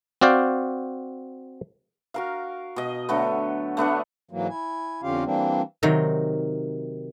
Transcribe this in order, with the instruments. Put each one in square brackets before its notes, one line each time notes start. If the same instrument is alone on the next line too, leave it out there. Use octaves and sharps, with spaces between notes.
[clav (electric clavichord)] C4 F#4 D5 F5 G5
[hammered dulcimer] F#4 A#4 F5
B2 D#5
D3 F#3 A3 B3
A3 B3 D4 F#5
[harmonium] G#2 E3 F#3 A#3
E4 G#5
F2 D3 C#4 F4 G4 F5
E3 G3 A#3 C4 D4
[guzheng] C3 D#3 F#3